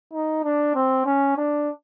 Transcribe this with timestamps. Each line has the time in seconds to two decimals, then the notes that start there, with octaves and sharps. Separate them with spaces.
0.13 D#4
0.44 D4
0.75 C4
1.06 C#4
1.37 D4